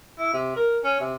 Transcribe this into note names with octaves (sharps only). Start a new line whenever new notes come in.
E4
C3
A#4
C#4
C3